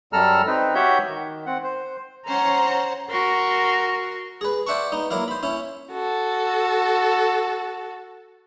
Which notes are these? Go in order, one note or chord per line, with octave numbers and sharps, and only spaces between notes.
F#2 G3 A4 A#5 E6 F6
C4 D#4 B4
F#4 G4 C#5 E5 F#5 G6
D#3
C4 F#5
C5
C#4 C5 C#5 F#5 A#5
F#4 A#4 C6 C#6
G#4 B4
C5 D5 E5 F#5 A5 C#6
B3 D#4
F#3 A#3 E4 F5
C5 B5
C#4 E4
F#4 A4